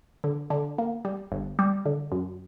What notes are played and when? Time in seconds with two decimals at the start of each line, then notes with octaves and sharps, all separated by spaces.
0.24 D3
0.50 D3
0.78 A#3
1.05 G3
1.32 G1
1.59 G3
1.86 D3
2.12 F#2